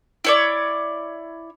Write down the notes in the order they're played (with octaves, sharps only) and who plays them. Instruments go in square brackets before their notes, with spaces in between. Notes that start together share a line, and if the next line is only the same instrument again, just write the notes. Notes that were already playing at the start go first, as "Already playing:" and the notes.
[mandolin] E4 C#5 D5